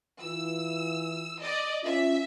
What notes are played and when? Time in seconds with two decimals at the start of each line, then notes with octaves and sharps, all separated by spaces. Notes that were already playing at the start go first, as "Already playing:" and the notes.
0.22 E3 F4 E6
1.41 D5 D#5
1.84 C#4 F4 E5